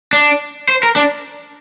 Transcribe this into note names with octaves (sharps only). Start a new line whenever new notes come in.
D4
C5
A#4
D4